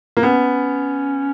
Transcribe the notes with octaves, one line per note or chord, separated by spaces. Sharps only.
A#3
B3 C#4